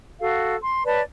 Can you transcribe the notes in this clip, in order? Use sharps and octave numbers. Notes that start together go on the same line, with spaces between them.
F#4 A4 F5
C6
B4 C#5 D5 A5